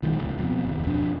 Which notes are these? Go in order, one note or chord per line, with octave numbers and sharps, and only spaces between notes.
B1 D#3 E3 G#3
D#1 C#2 A2
F2 B2
F#1 D#2
F2 B2 F3 D4